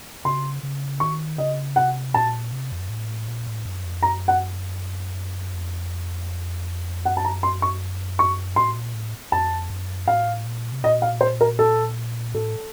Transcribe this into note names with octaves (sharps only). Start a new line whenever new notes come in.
C#3 C6
C#3
D#3 C#6
C#3 D#5
C3 F#5
A#2 A5
C3
F2
F#2
A2
A#2
A2
F#2
F2
F#2 A#5
F#5
F2
F#2 F#5
A5
A#5
C6
C#6
C#6
A2 C6
A#2
A2
F2 A5
F#2
A2 F5
A#2
C3
A#2 D#5
F5
C5
A#4
A4
A2 A4